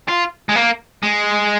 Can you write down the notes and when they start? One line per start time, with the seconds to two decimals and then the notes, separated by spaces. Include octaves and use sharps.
0.09 F4
0.49 G#3
0.56 A#3
1.03 G#3